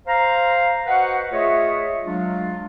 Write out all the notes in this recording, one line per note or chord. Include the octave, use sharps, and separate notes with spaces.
C5 F5 A#5
F#4 B4 C5 D#5 F#5
A3 F4 G#4 C#5 D#5 E5
F#3 G#3 D4 F4